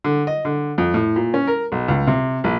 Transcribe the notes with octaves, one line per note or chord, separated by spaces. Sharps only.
D3
D#5
D3
F2
A2
A#2
C#4
A#4
B1
C#2
C3
A#1